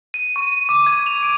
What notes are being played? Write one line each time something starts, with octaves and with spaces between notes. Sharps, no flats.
D#7
C#6
D6
G#6
F7
D7